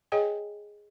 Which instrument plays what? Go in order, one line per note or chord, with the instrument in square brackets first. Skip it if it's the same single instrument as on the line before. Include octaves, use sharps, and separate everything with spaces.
[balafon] G#4 C#5 D#5 G5 G#5